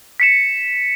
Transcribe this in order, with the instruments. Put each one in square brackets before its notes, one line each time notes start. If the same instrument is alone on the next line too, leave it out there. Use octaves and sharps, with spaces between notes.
[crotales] B6 C#7 E7